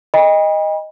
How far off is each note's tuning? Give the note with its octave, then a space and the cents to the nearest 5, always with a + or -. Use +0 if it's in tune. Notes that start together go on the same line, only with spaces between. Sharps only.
D#5 +0 G5 +45 B5 -35